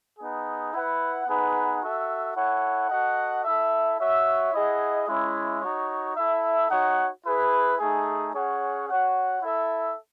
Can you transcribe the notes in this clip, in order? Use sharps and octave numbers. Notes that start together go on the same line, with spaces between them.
B3 D#4 G#4
E4 B4 F#5
B3 D#4 G#4 B4 F#5
F#4 A4 E5
E4 A4 C#5 F#5
F#4 A4 D#5 F#5
E4 A4 E5
F#4 C#5 E5
E4 G#4 D#5 F#5
G#3 C#4 E4
D#4 F#4 C#5
E4 A4 E5
D#4 F#4 C#5 F#5
E4 G#4 B4
A3 D#4 G#4
C#4 G#4 C#5 F#5
F#4 C#5 F#5
E4 A4 E5